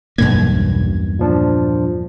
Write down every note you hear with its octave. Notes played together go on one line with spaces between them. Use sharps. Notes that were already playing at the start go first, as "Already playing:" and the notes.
B1 E2 G2 A#3 G#6
A#2 F3 D4